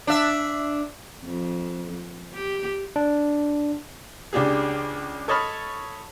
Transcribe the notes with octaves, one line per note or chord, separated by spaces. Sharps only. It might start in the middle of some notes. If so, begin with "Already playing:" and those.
D4 E5
F2
G4
D4
C#2 D4 G4 G#4
A4 C#5 D#5 A5 B5 F6